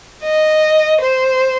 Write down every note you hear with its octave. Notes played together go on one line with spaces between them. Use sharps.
D#5
C5